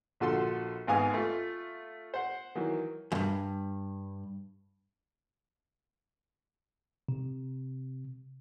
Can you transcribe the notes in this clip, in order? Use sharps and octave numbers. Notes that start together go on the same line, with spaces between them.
A#1 D3 F4 F#4 A4 C6
G#1 G#2 B3 F5 G#5 D#6
A3 F4
C5 F#5
D#3 E3 F#3 A#3
E2 G2
C3